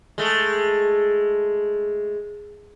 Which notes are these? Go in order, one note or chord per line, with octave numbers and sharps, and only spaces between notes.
G#3 A3